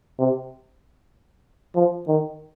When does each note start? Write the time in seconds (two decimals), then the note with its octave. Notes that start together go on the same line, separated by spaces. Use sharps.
0.19 C3
1.75 F3
2.07 D#3